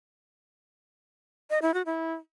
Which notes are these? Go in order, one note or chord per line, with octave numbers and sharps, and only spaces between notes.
D#5
E4
F#4
E4